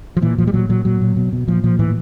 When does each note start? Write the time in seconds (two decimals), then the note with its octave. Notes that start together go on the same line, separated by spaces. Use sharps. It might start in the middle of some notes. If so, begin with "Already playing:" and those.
0.17 F3
0.22 A#2 E3
0.38 A#2 F3
0.47 G3
0.53 A#2 F#3
0.69 A#2 F#3
0.85 A#2 F#3
1.01 A#2
1.17 B2
1.33 B2
1.48 A#2 F3
1.63 A#2 F3
1.79 A2 E3